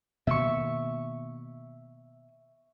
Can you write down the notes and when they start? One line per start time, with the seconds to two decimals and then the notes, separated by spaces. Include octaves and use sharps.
0.27 B2 D#3 A#3 E5 C#6